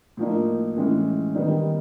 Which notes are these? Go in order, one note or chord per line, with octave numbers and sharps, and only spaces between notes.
A2 F3 A#3 D#4
A2 E3 G#3 C#4
D#3 G3 B3 D#4